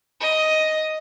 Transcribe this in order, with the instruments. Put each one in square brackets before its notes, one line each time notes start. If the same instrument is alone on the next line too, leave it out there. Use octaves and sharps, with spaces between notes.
[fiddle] D#5